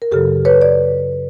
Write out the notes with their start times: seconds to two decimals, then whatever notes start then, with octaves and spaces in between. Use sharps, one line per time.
0.02 A#4
0.11 F#2 C#3 F#3 G4 A4
0.45 B4 C#5
0.62 D5